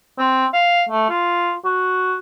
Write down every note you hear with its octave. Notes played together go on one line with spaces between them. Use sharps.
C4
F5
A3
F4
F#4